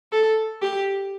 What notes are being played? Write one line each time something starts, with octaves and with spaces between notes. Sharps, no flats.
A4
G4